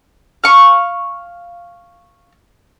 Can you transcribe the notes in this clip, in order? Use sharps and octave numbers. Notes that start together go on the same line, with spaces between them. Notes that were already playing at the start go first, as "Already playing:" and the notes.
F5 C#6